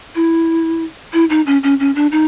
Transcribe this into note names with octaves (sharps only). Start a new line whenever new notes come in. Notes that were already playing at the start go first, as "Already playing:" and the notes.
E4
E4
D#4
C#4
C#4
C#4
D4
D#4